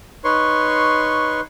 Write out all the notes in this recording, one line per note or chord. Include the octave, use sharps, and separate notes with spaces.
D#4 B4 C#5 C6 C#6